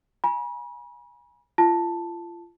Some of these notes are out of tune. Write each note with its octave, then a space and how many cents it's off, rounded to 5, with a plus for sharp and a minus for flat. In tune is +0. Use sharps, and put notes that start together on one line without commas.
G#5 +0 B5 -40
F4 -30 A5 +0